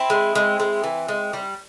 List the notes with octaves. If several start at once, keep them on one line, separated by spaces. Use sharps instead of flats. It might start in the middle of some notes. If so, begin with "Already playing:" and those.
Already playing: C4 E4
G#3
G#3
G#3
E3
G#3
G3